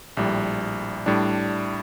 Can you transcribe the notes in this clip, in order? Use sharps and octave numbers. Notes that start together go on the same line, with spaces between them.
A#1 A2 G3
A2 G3 D4